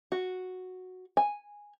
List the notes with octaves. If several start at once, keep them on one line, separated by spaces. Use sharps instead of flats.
F#4
G#5